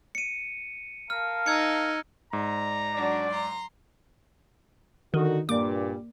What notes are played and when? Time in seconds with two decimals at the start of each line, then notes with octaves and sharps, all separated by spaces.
0.15 C#7 D#7
1.10 A#4 F5 A5 F6
1.46 D#4 E6 G#6 C#7
2.33 G#2 D5 A#5
2.95 F#3 D4 F#4 D5
3.31 A#5 C6
5.14 D3 D#3 D#4 F#4
5.49 G2 A#2 G3 A#3 A#4 D5 D6